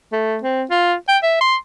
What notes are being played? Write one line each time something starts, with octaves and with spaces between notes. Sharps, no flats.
A3
C4
F4
G5
E5
C6